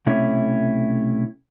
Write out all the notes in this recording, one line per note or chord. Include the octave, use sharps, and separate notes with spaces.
B1 C3 A3 C#4 E4